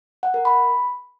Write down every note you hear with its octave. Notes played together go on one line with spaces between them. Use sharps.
F#5
A#4
B5